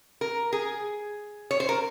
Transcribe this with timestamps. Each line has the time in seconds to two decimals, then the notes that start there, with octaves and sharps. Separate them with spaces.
0.21 A#4
0.53 G#4
1.51 C#5
1.60 C5
1.69 A#4